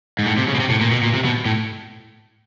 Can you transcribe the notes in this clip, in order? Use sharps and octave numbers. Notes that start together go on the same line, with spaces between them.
G#2
A2
C3
C#3
B2
C3
A2
A#2
B2
A#2
C3
B2
A2